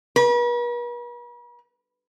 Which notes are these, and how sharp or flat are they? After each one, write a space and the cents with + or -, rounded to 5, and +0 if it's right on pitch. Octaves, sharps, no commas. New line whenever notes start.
B4 -45